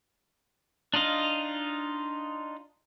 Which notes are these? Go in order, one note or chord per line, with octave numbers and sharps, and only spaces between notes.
D4 D#4 F4 D#5 F5